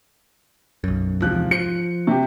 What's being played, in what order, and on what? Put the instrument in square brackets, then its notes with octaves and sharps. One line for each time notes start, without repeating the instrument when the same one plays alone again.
[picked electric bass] B1 F#2
[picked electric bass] E2 G#2 C3 [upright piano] F3 F#6
[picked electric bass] F3 [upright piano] C#7
[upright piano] C3 G4